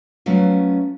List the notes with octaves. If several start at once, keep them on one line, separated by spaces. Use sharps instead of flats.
F#3 A3 B3 C#4 F4